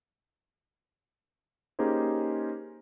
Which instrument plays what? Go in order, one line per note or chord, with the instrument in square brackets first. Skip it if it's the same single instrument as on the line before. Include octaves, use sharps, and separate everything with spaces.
[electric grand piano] A#3 C#4 D#4 G4 G#4 C5